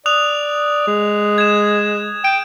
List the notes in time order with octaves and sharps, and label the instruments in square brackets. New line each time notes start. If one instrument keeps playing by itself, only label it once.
[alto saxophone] D5 [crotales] D#6 F#6 F7
[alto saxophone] G#3
[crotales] G#6 E7
[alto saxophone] G5 [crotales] G6 D7